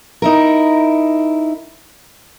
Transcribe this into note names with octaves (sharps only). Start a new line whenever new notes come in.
D#4 E4 A#4